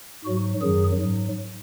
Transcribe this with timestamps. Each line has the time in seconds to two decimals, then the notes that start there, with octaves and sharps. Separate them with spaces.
0.24 G#2 F#3 F#4
0.61 F#2 D#3 F#3 G#4
0.99 G#2 F#3